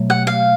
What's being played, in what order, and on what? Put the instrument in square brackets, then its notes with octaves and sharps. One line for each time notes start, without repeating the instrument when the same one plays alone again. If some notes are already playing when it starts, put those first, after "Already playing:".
Already playing: [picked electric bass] B2 F#3 A3
[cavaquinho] F#5
F5